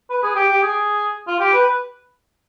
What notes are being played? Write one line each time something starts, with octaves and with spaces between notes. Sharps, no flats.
B4
G#4
G4
G4
G#4
F4
G4
B4